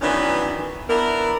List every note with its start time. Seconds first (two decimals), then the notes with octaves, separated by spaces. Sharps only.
0.02 D#3 E3 F#3 B3 C#4 D4
0.89 B3 D4 E4 A#4